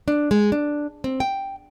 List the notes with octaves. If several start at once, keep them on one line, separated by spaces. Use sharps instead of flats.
D4
G#3
D4
C4
G5